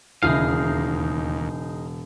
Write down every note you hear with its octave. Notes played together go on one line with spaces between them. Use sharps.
E1 D#2 C#3 D#4 E4 G#4 F5